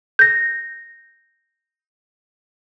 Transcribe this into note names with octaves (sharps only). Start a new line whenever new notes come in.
G6 A#6